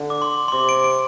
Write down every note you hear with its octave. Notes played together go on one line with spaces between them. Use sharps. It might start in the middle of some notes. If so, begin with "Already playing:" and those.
Already playing: D3
D6
C6
C6
C3 D6
D7
D7